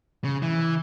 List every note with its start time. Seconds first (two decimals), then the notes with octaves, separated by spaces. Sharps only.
0.24 C#3
0.42 E3